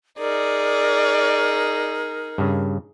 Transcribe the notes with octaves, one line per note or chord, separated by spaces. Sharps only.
D#4 G#4 A#4 D5
G2 C#3